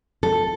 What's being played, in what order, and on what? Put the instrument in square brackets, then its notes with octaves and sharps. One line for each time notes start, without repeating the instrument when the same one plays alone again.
[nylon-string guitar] A4